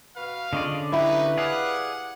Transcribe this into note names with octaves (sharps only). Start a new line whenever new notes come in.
B2 F#4 B4 F5
D3 C#4 F4 G#4 D5 D#5
D#4 E4 G4 B4
G#4 D5 F5 F#5